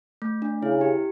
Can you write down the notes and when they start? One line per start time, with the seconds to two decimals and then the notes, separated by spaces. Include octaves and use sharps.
0.22 A3
0.42 D4
0.62 C#3 E4
0.81 G4